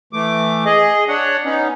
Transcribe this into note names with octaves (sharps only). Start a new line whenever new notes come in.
E3 A3 D6
G#4 D#5
D4 C#5 F#5
B3 C#4 D#4